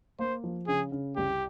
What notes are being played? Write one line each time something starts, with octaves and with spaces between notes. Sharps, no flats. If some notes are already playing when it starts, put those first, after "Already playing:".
A#3 C5
F3
C#3 G#4
C#3
C2 G4